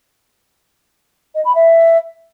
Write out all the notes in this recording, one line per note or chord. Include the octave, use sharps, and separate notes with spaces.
D#5
B5
E5